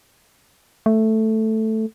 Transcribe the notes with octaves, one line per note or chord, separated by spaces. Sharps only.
A3